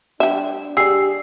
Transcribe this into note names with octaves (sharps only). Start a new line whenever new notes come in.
G3 D4 E5
G3 G4 G#4 E6 C7